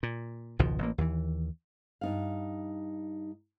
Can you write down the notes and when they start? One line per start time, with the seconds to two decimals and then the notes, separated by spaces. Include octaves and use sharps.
0.03 A#2
0.59 G#1 C#2 B2 F3
0.79 A1 A#3
0.98 D#2 E3
2.01 G2 D#4 F5